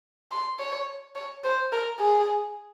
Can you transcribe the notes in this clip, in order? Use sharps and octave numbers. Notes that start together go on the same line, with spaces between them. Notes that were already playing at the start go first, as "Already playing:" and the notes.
C6
C#5
C#5
C5
A#4
G#4